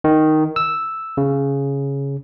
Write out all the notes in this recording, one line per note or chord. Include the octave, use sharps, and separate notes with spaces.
D#3
E6
C#3